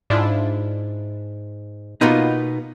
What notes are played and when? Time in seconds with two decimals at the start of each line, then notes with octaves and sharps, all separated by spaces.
0.10 G#2 D4 E4 F4
2.01 B2 A#3 B3 D#4 F4